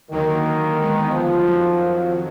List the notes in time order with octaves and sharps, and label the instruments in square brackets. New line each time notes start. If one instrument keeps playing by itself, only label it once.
[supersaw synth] D#2 D3 F#3 A#3 [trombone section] D#3
[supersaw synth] D#2 D3 G#3 B3
[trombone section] F3
[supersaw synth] F2 D#3 F#3